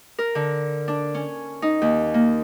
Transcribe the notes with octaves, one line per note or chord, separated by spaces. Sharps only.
A#4
D3
D4
C#4
D#4
D#2
A#3